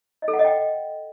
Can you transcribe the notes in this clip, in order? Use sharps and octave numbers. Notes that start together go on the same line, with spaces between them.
D#5
A4
F#5
D#5
G5